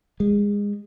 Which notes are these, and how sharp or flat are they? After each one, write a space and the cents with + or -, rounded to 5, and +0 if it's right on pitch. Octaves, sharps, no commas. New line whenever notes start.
G#3 -25